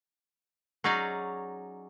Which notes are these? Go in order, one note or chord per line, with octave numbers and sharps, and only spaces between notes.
F#3 C#4 D#4 G#4 D5